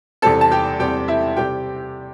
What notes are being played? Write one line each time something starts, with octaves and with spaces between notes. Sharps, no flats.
E2 C3 G3 C4 A4 A5
A5
G4 G5
E2 C3 G3 C4 G4 G5
E4 E5
C3 G3 C4 G4 G5